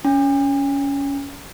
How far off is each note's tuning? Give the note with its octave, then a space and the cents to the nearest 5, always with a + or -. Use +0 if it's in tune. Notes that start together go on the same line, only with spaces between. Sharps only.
C#4 +20 G#5 -45